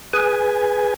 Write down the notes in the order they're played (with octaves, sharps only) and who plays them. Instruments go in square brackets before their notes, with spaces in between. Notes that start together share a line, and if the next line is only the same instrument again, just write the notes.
[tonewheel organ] G#4 B4 G#5